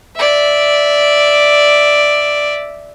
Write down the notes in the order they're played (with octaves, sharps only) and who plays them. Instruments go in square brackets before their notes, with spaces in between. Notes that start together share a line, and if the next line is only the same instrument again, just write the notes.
[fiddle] D5 E5